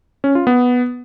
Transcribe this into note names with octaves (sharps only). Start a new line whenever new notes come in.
C#4
F4
B3